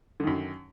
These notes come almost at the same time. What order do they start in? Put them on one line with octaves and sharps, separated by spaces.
D3 D#3 F#2